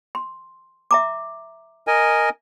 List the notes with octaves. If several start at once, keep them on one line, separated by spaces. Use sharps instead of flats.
C6
E5 A#5 D6
A#4 D#5 G#5